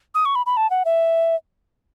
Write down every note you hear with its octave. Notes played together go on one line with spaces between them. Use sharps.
D#6
C#6
B5
B5
A5
F#5
E5